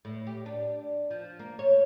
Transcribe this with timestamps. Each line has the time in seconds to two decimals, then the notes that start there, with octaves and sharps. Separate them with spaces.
0.05 A2
0.27 G4
0.46 D4
1.11 F3
1.39 A#3
1.59 C#5